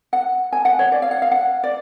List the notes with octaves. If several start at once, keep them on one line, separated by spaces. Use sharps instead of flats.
F#5
G#5
F#5
C#5
D5
F5
F#5
F5
F#5
D5